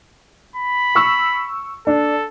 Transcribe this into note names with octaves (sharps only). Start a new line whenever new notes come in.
B5
C#6 E6
D4 A4